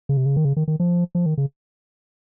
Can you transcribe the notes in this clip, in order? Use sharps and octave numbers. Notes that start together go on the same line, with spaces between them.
C#3
C3
C#3
D#3
C#3
D#3
D#3
F3
F3
D#3
C#3